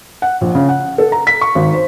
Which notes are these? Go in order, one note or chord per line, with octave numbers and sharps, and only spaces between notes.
F#5
A#1
C#3
F#5
A4
A#5
B6
C#6
G#1
C5